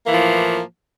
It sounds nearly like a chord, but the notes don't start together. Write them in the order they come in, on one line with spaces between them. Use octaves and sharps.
A#3 E3 A2 F3